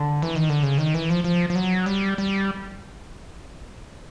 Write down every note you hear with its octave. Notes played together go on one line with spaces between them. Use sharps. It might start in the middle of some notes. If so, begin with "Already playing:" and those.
Already playing: D3
E3
D#3
D3
C#3
D#3
E3
F3
F3
F3
F#3
G3
G3